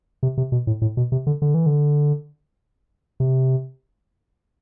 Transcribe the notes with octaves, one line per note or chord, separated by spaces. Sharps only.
C3
C3
B2
A2
A2
B2
C3
D3
D3
E3
D3
C3